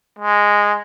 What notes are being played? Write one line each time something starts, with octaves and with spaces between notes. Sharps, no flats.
G#3